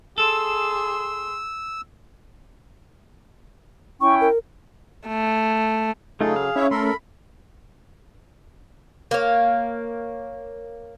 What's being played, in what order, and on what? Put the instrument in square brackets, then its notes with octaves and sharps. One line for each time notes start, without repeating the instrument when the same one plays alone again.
[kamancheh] G#4 C6 [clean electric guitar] A4 [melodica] E6
[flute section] C#4 E4 G5 [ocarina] C#6
[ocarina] A#4
[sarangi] A3
[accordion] C#3 F#3 [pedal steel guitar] A3 D#4 F4 [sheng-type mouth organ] G#4 [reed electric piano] A4
[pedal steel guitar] F5
[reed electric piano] C#4 [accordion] E4 C#5 E5
[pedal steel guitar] A3 [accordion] A4 A#4 [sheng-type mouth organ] B5 C6
[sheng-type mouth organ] B5
[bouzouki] A#3 C#5